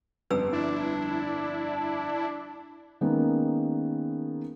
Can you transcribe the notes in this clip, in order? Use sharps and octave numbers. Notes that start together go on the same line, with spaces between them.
G1 F2 B4 E6
D4 E4
D#3 G#3 A#3 B3 C#4